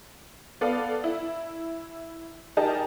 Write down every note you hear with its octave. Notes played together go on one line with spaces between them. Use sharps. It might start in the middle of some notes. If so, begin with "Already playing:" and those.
B3 A4 D5 F5
E4
D#4 G4 G#4 A#4 A5